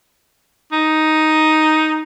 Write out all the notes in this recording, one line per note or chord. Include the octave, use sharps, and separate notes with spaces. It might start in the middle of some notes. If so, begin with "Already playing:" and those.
D#4